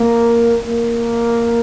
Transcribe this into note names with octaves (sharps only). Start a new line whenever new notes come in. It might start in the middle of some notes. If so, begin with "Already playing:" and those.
Already playing: A#3
A#3